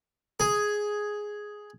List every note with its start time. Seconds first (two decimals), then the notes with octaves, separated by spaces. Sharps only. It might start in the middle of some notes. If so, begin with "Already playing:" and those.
0.40 G#4